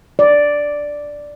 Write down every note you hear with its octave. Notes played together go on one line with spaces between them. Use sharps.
D5